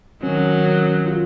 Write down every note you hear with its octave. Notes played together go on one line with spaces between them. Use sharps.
D#3 F#3 C#4
C#4
F4